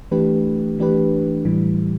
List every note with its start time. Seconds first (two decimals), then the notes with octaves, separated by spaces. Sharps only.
0.11 E3 A3 D4 G4 B4
0.78 E3 A3 D4 G4 B4
1.45 A2 E3 G3